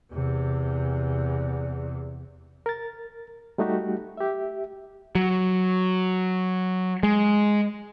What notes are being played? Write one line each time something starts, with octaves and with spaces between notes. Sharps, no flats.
E2 C3
A#4 A6
G3 A3 D#4 F#4 G4
G4 E5
F#3
G#3